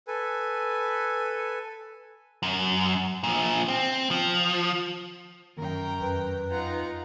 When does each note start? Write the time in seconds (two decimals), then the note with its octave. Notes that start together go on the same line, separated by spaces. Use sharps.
0.08 A4 B4 G#5
2.43 F#2
3.23 A#2 F3
3.68 C4
4.11 F3
5.58 F#2 D#3 A#4 G5 A#5
6.01 F2 B4
6.50 D#4 F4 F#5 A#5